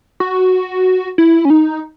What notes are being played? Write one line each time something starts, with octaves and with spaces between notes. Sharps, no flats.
F#4
E4
C#4
D#4